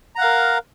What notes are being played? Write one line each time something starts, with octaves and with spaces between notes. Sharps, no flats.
A#4 F5 F#5 A#5